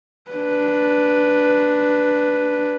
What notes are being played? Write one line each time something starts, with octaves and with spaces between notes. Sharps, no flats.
D4 B4